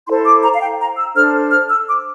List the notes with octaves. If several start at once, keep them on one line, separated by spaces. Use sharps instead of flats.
E4 A4 C5 C6
D6
A#5
F5
G5
A#5
E6
D4 A4 C5 F6
F6
E6
D6